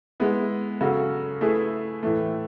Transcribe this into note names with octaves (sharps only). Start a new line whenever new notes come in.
G#3 B3 E4
C#3 F#3 C#4 F#4 A4
A3 E4 G#4 B4
A2 E3 A3